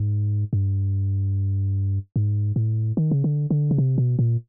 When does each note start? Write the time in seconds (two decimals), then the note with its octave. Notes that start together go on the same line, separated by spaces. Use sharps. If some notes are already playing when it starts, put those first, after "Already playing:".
Already playing: G#2
0.53 G2
2.16 G#2
2.56 A2
2.97 D#3
3.11 C#3
3.24 D3
3.51 D3
3.71 C#3
3.78 C3
3.98 B2
4.19 A#2